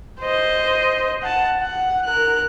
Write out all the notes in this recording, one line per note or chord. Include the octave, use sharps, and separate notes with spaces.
C5 D#5
F#5 A5
F#5
A#4 F#6